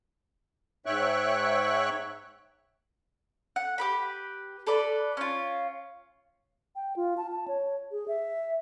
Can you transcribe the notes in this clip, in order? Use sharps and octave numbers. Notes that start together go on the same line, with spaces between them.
G#2 C#5 E5 G5 C#6 F#6
F#5
G4 B4 B5
A4 B4 D5 B5
C#4 F4
G5
F4
A5
A5
C#5
G#4
E5